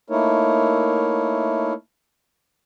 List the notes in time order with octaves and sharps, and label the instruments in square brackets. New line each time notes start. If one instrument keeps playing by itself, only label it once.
[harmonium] A3 A#3 D#4 E4 A#4 C#5